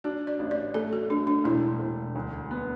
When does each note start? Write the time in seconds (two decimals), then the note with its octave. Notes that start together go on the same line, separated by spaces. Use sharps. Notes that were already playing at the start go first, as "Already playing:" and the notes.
0.04 D4 F#4
0.27 D5
0.39 A1
0.51 D5
0.74 A3 A4
0.93 F#4
1.09 A3 D4
1.27 D4
1.44 E1 E4
1.80 E1
2.15 D2
2.51 B3